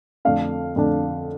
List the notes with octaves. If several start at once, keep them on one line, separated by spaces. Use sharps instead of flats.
F2 D3 A3 D4 F5
F2 D3 A3 D4